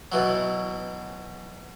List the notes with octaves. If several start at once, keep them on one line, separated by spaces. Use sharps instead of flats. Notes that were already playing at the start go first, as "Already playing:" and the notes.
B2 E3 F#3